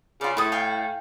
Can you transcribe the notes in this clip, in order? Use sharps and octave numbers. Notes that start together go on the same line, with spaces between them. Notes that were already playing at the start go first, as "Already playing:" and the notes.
C#3 F4 D5
A2 E4 D#6
F5 G5 G#5